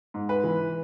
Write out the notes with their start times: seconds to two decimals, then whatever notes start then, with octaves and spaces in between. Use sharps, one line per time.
0.14 G#2
0.29 B4
0.44 E3